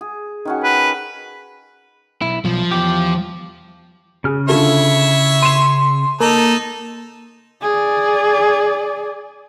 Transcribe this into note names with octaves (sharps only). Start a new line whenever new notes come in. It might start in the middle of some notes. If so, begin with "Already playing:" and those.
G#4
D#3 C#4 F#4
B4
B1 E4
B1 F3
E2 G4
C#3 G#4 F6
D3 E4 F4 A4 C#5 E5
C6 D#7 E7
A#3 D#4 A4
G#4 D5